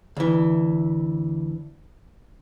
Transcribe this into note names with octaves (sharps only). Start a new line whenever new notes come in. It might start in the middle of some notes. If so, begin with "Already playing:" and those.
D2 E3